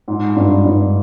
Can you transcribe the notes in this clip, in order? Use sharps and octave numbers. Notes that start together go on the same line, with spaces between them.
G#2
G2
G2